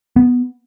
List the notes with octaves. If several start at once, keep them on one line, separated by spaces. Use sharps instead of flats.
B3